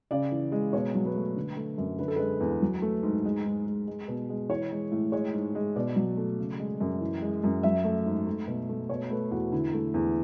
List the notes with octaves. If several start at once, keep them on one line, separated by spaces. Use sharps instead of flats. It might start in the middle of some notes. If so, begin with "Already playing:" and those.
C#3 D5
E3
G#3
B2 C#5
F#3
B4
A3
D3
A3
F#2
D3 B4
A4
G#3 B4
E2
F#3
A3
G#2
G#3
G#2
G#3
G#3
B2
G#3
E3 C#5
G#3
A2
G#3 C#5
G#2
G#3
B2 D5
F#3
A3
C#3
G#3
F#2
E3
G#3
F#2
F#3 E5
A3
G#2
A3
B2
A3
B2 C#5
A3 B4
E2 F#4
D3 E4
A3
E2